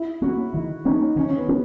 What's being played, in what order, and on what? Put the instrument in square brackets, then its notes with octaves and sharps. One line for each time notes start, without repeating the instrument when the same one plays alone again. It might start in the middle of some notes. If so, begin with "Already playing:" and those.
Already playing: [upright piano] E4
[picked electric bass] A#3 C#4 [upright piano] F#4
[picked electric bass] D#3 [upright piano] E4
[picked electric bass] A#3 C#4 [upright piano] D#4
[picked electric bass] D#3 [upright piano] C#4
[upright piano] C#4
B3
[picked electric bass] C#4